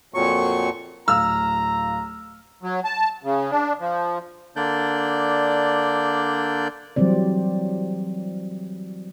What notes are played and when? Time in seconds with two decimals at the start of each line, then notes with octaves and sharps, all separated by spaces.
0.14 F2 A#2 F#3 C#6
1.08 D1 F5 A#5 E6 F6
2.63 F#3
2.85 A5
3.23 C#3
3.51 D4
3.80 F3
4.56 D3 A#3 D4 D5 G6
6.96 E3 F#3 G3 C4 D5